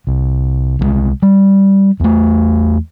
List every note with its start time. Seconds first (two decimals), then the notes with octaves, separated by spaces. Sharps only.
0.07 C2
0.79 C2 F3 G#3
1.22 G3
2.00 E2 A3